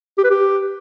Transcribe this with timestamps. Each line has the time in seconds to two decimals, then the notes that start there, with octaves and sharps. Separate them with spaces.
0.18 G4
0.24 B4
0.30 G4